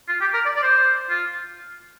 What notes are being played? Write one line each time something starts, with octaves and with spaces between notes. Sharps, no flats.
F4
G4
A#4
D5
D5
C5
F4